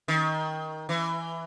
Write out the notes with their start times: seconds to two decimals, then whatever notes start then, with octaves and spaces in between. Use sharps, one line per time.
0.08 D#3
0.89 E3